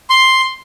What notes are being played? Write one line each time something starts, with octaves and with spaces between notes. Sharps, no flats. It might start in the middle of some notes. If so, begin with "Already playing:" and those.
C6